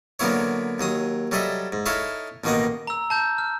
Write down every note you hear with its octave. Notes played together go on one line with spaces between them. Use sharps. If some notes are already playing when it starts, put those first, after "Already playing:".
D3 F#3 A#3 B3 E4 C#5
D#2 F#3 D#6
F#3 G3 A4 D#5 E5
G#2
D#4 E4 A4 C#5 E5 F5
A1 B2 D#3 A#3 D#4 F#5
A#5 E6
A5 G6
F6